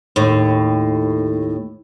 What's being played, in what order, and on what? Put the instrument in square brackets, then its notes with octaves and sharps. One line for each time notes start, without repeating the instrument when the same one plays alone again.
[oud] D#2 A2